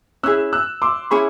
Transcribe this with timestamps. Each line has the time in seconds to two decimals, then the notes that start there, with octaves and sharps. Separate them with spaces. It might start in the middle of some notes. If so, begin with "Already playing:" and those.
0.23 C#4 E4 G#4 E6 F#6
0.53 E6 F#6
0.82 C6 D6
1.11 C#4 E4 G#4 B5 C#6